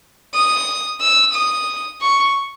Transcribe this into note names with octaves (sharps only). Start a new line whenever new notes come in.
D#6
E6
D#6
C#6